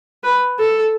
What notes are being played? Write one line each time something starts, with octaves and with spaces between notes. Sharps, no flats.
B4
A4